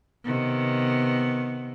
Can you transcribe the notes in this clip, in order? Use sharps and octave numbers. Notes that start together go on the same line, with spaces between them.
C3 D#3 B3